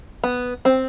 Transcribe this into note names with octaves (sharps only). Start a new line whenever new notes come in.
B3
C4